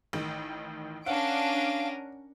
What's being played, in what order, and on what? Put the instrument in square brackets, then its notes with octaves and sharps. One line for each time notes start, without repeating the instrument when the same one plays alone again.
[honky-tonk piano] A1 D#3
[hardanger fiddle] C#4 A#4 [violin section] D4 D7 [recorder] F5 [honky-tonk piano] F#5